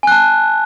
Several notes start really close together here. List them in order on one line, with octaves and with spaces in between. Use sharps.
G#5 F#6 A5